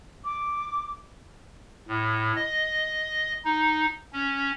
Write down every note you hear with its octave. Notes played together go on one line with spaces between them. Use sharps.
D6
A2
D#5
D#4
C#4